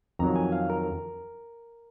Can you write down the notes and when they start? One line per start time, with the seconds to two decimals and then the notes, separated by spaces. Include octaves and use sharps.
0.19 F2 D#3 F#3 A#5
0.36 G#5
0.52 F5
0.70 A#4